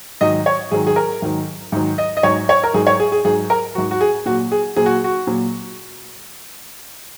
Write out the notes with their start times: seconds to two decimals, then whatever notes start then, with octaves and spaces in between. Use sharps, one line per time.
0.21 G#2 D#3 F#3 D#5
0.46 C#5
0.71 G#2 D#3 F#3 G#4
0.87 G#4
0.96 A#4
1.22 G#2 D#3 F#3
1.72 G#2 D#3 F#3
1.98 D#5
2.17 D#5
2.23 G#2 F#3 C#5
2.49 C#5
2.63 A#4
2.73 G#2 F#3 G#4
2.87 C#5
3.00 G#4
3.12 G#4
3.25 G#2 F#3 G#4
3.50 A#4
3.75 F#3 F#4
3.78 G#2
3.91 F#4
4.01 G#4
4.26 A#2 F#3 F#4
4.52 G#4
4.76 A#2 F#3 G#4
4.86 F#4
5.04 F#4
5.27 A#2 F#3